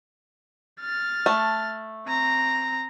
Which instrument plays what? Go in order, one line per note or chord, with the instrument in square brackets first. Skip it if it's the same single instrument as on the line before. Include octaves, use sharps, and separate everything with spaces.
[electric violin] F6 A6
[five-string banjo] A3
[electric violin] C4 A#5